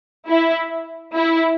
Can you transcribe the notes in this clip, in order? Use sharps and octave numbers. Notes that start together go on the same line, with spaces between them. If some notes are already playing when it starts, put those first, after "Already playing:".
E4
E4